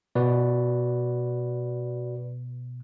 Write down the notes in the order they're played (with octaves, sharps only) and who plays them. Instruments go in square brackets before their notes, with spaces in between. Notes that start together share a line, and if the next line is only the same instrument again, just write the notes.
[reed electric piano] B2 [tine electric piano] F#4 B4 D5